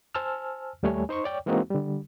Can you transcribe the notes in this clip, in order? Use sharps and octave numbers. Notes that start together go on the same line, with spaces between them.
C5 G#5 A5 E6 F6
D#2 G3 A3 C#5 G#5
D#4 C5 C6 C#6
C#5 D5 G5
E3 G#3 A#3 C4 D#4 F#4
D3 G3